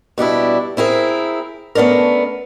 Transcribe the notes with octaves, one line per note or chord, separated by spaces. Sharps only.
B2 G3 D4 E4
C4 E4 G#4 A#4
A3 B3 C#4 D4 A#4